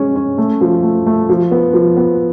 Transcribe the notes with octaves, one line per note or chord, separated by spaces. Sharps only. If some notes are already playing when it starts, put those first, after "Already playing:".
Already playing: G#3 C#4
C#4
A3
F3
A3
A3
F3
B3
F3
B3